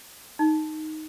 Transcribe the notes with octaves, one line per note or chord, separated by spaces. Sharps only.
D#4